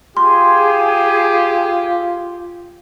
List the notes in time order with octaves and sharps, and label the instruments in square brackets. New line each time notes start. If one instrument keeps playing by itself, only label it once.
[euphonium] F4 [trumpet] G4 [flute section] G#4 [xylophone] C6